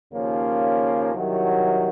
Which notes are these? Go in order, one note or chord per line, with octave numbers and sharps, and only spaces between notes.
D#2 C#3 F3 A#3 C#4
C2 C3 D#3 F#3